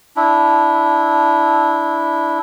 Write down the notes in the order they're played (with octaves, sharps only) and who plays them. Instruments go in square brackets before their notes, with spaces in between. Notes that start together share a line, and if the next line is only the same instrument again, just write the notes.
[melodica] D4 E4